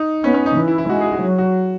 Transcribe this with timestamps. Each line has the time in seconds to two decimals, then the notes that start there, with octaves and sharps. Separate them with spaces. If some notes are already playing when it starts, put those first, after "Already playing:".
Already playing: D#4
0.23 B3 C#4
0.34 C#4
0.46 D#4
0.56 E3
0.68 E4
0.78 E4
0.89 G#3 F#4
1.01 G#4
1.12 F#4
1.22 F#3
1.38 F#4